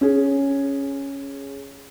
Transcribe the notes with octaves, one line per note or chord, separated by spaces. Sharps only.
C#4 G#4